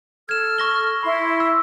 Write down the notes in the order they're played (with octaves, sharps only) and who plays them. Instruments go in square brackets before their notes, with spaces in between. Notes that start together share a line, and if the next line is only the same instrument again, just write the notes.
[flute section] A4 F6 [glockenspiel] G#6 E7
[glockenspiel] C#6 A#6 G7
[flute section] E4 C6 [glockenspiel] B5
[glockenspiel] E6